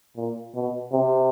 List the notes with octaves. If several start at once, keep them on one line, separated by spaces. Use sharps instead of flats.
A#2
B2
C3